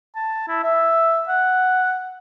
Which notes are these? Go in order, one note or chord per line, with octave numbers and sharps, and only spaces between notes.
A5
E4
E5
F#5